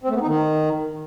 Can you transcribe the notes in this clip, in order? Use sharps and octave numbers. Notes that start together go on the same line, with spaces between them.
C4
A3
B3
D#4
D#3